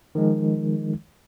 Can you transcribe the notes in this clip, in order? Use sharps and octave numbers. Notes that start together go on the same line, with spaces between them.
D#3 F3 G#3